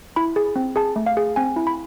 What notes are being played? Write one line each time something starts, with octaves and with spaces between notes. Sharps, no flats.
E4 B5
G#4
C4
G#4 A5
A3
F5
G#4
C4 G#5
E4
B5